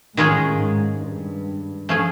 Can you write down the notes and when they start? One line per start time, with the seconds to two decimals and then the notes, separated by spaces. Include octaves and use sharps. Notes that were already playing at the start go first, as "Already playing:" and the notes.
0.17 A2 D#3 G#3 C#4 F4 G#4
0.61 G#2
1.03 G2
1.89 F3 A3 C#4 F4 G#4